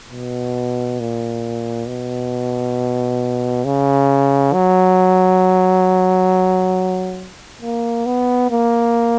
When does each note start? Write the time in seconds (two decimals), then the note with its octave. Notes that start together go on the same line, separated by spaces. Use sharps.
0.12 B2
1.00 A#2
1.88 B2
3.65 C#3
4.54 F#3
7.62 A#3
8.06 B3
8.51 A#3